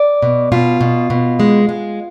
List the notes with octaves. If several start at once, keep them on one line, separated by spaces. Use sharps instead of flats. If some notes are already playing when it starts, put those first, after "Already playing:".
Already playing: D5
B2
B2 F4
B2
B2
G#3
G#3